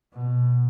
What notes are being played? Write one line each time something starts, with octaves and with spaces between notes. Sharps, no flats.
B2